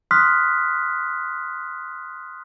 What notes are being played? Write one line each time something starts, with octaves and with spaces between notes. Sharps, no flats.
C6 D#6 F6 F#6 B6